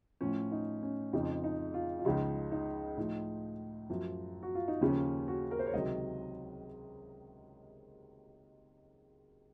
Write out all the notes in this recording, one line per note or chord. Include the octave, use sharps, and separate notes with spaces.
A2 F3 C#4
D#4
C#4
F2 C#3 F3 D#4
D#4
F4
F4
C#2 C#3 F3 D#4
D#4
A2 F3 D#4
F#2 F3
F#4
F4
D#4
D#2 C#3 F3 C#4
F#4
A#4
C5
C#5
C#2 C3 D#3 F#3 D#5